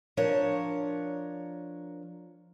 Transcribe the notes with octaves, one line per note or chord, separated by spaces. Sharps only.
F3 D4 A#4 C#5